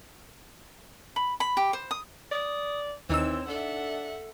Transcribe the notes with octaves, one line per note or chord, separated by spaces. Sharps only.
B5
B5
G4
C5
D#6
D5 D#6
D#2 E3 C4 D#4 C#5 E6
D4 A4 E5 F#5